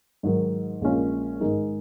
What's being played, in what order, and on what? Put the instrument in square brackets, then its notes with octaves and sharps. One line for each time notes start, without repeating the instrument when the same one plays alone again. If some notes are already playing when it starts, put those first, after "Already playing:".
[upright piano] G#2 D#3 F#3
A#1 A#2 G#3 C#4 F4
G#2 D#3 G#3 D#4